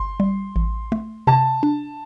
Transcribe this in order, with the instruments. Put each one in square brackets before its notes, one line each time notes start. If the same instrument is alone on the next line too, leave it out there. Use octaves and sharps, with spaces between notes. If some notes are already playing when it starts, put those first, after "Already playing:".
Already playing: [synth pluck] G1 [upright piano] C6
[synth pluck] G3
A1
A3
[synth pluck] C3 [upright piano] A5
[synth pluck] D4